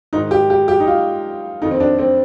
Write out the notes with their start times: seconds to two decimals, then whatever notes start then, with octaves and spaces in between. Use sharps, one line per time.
0.13 G#2 D#3 D#4
0.31 G4
0.50 G4
0.68 G4
0.80 D#4
0.87 F4
1.62 F2 D#3 D#4
1.71 C4
1.80 D4
1.99 C4